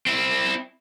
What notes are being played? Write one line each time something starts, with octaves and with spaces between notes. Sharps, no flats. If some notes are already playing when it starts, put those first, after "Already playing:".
C4 E4